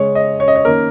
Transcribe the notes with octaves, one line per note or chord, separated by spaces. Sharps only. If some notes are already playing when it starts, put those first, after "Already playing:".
Already playing: C#3 G#3 C#4 C#5
D#5
C#5
D#5
C#5
D#3 A#3 C#4 A#4